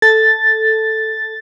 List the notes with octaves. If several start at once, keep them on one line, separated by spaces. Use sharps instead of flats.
A4 A6